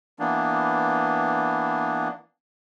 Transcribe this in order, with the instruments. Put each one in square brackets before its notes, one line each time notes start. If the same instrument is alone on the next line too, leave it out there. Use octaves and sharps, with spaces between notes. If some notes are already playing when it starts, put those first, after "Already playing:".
[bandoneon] E3 A#3 B3 D4